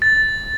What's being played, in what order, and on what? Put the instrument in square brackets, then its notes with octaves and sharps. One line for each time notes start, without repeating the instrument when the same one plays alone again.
[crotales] A6